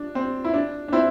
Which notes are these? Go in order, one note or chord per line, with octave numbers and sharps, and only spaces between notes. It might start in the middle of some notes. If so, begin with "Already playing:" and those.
Already playing: D4
C4
E4
D4
D4
C4 E4